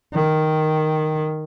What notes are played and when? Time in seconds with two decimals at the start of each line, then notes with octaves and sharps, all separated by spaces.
0.14 D#3